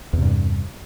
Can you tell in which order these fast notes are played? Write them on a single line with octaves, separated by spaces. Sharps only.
E2 C3 G2